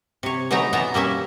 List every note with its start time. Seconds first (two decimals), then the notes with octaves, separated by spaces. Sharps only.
0.23 C3 C#5
0.51 E3 F#3 A3 D#4 A#5
0.73 B2 E3 B3 A5 A#5
0.94 G3 A#3 C#4 E5